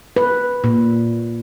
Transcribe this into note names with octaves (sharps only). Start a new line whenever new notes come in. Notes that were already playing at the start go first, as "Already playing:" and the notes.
B4
A#2